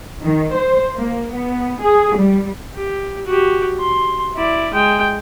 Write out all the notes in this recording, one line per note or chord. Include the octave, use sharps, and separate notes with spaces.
D#3
C5
A#3
B3
G#4
G3
G4
F#4 G4
C6
E4 D5
G#3 G5